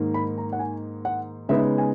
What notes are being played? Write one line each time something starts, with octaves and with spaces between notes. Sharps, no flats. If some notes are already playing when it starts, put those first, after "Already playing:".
Already playing: G#2 D#3 A#3
B5
A#5
F#5
G#5
F#5
C#3 G#3 B3 D#4 E5
G#5